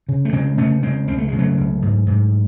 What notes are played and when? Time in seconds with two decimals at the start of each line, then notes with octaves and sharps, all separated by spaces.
0.09 C#3
0.25 A3
0.33 C#3 G#3 C4
0.58 C#3 A3 C#4
0.82 C#3 G#3 C4
1.08 C#2 C4
1.18 A3
1.28 C#3 G#3
1.39 F#3 A3
1.57 C#2
1.82 G#2
2.07 G#2